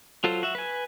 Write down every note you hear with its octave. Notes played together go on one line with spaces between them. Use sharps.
F#3 F4 A4 C5
F#4 E5
B4 G#5